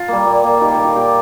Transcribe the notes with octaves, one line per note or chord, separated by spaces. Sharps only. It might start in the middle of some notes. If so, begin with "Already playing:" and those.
Already playing: F4
G3 A#3
A#2
A#3
D#3 G4
A#4
A#3
F4
A#2 G4